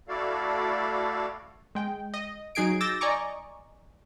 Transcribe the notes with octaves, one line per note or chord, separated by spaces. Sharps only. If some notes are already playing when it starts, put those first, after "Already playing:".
A3 E4 F#4 A4 D5 F5
G#3 G5
D#5
F#3 D#4 G#4 G#6 C7 D7
D6 E6 G6 A6 A#6
D5 D#5 G#5 A#5 C#6 D6